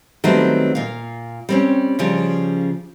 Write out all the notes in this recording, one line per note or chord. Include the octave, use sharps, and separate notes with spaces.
D#3 F#3 G3 A3 B3 C4
A#2 F5
G3 C4 C#4
C#3 F3 G3